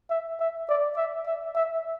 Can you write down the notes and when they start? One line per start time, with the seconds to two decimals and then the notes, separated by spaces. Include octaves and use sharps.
0.10 E5
0.40 E5
0.69 D5
0.97 E5
1.26 E5
1.55 E5